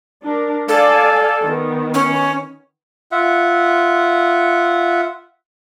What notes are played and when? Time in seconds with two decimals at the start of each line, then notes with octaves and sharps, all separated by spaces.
0.24 D4 A#4
0.69 A4 D5 F5 G#5
1.42 D#3 B3
1.94 C#4
3.12 F4 E5 F#5